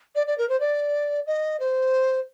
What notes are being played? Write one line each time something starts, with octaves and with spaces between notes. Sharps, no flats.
D5
D5
A#4
C5
D5
D#5
C5